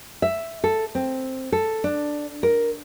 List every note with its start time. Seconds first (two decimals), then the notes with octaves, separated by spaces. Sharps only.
0.22 E5
0.64 A4
0.95 C4
1.52 A4
1.84 D4
2.43 A#4